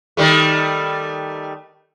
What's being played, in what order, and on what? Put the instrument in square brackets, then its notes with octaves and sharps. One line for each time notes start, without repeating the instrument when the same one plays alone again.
[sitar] D#3 G3 A3